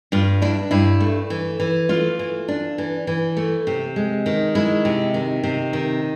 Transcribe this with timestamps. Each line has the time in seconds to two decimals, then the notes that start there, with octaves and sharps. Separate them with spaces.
0.12 G2 F4
0.42 D4 E4
0.71 G2 E4
1.01 A3
1.30 E3
1.60 E3
1.89 A3 F4
2.19 E3
2.48 D4
2.78 E3
3.07 E3
3.37 A3
3.67 C3
3.96 G#3
4.26 D#3
4.55 G#3 E4
4.85 C3
5.14 D#3
5.43 C3
5.73 D#3